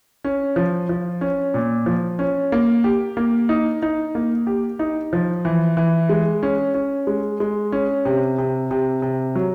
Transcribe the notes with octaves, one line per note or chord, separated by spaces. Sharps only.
C#4
F3
F3
C#4
A#2
F3
C#4
A#3
G4
A#3
D#4
D#4
A#3
G4
D#4
F3
E3
E3
G#3
C#4
C#4
G#3
G#3
C#4
C3
C3
C3
C3
F#3